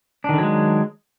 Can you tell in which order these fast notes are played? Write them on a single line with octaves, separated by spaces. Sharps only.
D4 D#3 D3 F#3 G#3